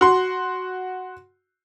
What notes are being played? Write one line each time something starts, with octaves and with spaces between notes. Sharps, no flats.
F#4 C6